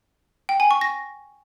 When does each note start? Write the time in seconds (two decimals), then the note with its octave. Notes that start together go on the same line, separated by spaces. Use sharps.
0.49 G5
0.60 G#5
0.71 C#6
0.81 A#6